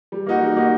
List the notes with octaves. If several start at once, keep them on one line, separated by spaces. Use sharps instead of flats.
G3
A#3 D#4 F#4
G3
A#3 D#4 F#4